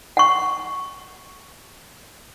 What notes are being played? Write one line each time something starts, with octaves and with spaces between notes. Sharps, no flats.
F#5 C#6